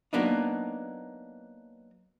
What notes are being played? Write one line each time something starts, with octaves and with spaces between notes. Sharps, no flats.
F#3 A#3 B3 D4 D#4